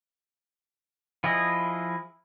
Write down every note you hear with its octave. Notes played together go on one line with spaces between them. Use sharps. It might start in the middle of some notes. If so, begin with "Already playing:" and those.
F3 E4 G#4 D#5